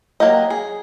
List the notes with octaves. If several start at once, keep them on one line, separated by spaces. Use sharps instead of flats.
F#3 A#3 G4 D#5
G#4